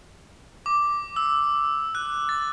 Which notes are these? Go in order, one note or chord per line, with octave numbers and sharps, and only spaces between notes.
D6
E6
F#6
A6